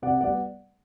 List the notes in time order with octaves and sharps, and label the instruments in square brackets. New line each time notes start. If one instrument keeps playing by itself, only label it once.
[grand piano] C3 D5 F#5
G3 B3 D5 F#5